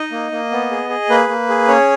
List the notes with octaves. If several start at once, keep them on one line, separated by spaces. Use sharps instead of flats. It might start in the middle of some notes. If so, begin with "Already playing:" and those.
Already playing: D#4 D#5
A#3
A#3
B3
G#4
G#4
A#3 B4
A#3
G#4
C#4 C#5